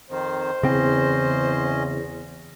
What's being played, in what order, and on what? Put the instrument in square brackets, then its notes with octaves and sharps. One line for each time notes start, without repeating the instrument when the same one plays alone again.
[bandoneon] F2 D#3 [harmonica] C5
[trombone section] E2 [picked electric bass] C#3 C4 [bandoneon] C#4 D#5